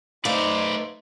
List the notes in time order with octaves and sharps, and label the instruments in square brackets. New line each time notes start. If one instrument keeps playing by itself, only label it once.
[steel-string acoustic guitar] A3 F5 [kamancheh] D#4 C5 [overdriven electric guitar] B4 D5